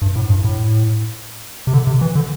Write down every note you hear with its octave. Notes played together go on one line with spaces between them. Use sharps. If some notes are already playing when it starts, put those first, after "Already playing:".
G2
A2
G2
A2
C3
D3
C3
E3
D3